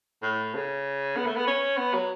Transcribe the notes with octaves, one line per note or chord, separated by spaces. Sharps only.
A2
C#3
B3
A3
B3
C#4
B3
F#3